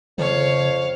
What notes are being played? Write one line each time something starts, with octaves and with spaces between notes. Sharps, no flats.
F2 C#3 C#5 F5